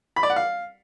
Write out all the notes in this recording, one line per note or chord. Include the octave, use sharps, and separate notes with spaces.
B5
D5
F#5
F5